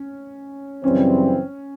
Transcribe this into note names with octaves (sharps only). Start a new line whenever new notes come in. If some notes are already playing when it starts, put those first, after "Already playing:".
Already playing: C#4
F#2 C#3 E3 G3 C4 C#4